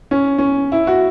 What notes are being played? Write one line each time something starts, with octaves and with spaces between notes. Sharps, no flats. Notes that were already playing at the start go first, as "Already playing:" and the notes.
C#4
C#4
E4
F#4